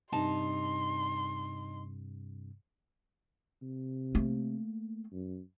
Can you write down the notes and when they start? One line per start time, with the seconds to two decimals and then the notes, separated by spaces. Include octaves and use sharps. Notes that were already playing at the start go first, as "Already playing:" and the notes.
0.12 G2 C3 D#4 A5 C6
3.62 C3
4.15 A3 A#3
5.12 F#2